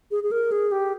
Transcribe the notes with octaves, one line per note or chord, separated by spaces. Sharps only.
G#4
G#4
A#4
G#4
G4